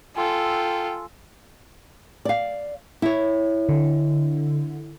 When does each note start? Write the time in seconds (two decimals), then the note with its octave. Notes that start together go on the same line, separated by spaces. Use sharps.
0.17 F4 A4 G5 G#5 C6 E6
2.25 D5 F5
3.02 E4 C#5
3.69 D3